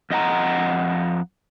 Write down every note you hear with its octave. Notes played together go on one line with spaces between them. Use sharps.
F2 D#5 F#5 A#5